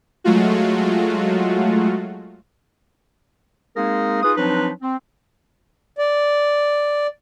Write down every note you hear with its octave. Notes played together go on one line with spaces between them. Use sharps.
F#3 G#3 A3 F4 F#4
G#3 A#3 C4 D#4 G#4 A#4
D#4 F4 G#4 B4 D#6
F3 F#3 C4 D4 D#4 B4
C4
D5